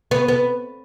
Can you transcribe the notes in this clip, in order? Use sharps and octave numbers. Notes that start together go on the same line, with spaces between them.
B3
B3